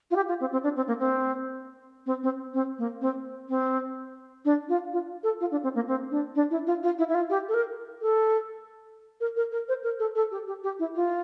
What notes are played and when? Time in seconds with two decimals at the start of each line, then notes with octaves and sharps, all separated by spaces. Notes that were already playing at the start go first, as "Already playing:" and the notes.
0.11 F4
0.16 G4
0.28 F4
0.40 C4
0.52 C4
0.63 D4
0.76 C4
0.87 A#3
0.99 C4
2.06 C4
2.23 C4
2.53 C4
2.78 A#3
3.01 C4
3.49 C4
4.45 D4
4.69 F4
4.93 F4
5.23 A4
5.40 F4
5.51 D4
5.63 C4
5.75 A#3
5.88 C4
6.11 D4
6.35 D4
6.50 E4
6.66 F4
6.83 F4
6.98 E4
7.09 E4
7.14 F4
7.30 G4
7.48 A4
7.54 A#4
8.01 A4
9.20 A#4
9.36 A#4
9.51 A#4
9.68 C5
9.83 A#4
9.99 A4
10.15 A4
10.31 G4
10.47 G4
10.63 G4
10.79 E4
10.95 F4